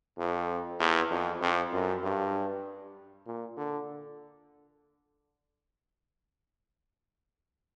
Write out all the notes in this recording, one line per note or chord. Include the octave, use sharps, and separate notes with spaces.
F2
E2
F2
F2
F#2
G2
A#2
D3